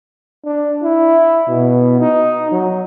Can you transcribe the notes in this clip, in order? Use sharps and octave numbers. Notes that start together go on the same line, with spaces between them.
D4
E4
B2
D#4
F#3